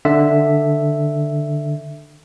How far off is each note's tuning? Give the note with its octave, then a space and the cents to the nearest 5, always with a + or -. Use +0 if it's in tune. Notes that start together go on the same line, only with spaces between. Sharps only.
D3 +10 E5 +0